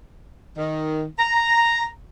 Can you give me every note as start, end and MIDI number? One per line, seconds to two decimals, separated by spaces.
0.57 1.04 51
1.19 1.86 82